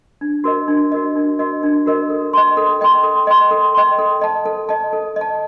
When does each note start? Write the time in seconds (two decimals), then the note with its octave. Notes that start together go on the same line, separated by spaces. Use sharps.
0.21 D4
0.44 F#4 A#4 D#5
0.68 D4
0.92 F#4 A#4 D#5
1.15 D4
1.39 F#4 A#4 D#5
1.63 D4
1.86 F#4 A#4 D#5
2.09 A4
2.33 D#5 G5 C6
2.57 A4
2.81 D#5 G5 C6
3.04 A4
3.27 D#5 G5 C6
3.51 A4
3.74 D#5 G5 C6
3.99 A4
4.21 D#5 A5
4.45 A4
4.69 D#5 A5
4.93 A4
5.16 D#5
5.21 A5